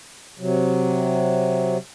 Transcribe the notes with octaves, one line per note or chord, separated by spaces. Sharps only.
C3 F#3